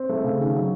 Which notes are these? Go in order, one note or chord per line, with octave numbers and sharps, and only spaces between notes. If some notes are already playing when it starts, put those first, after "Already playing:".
Already playing: C4
A3
C#3
D#3
F#3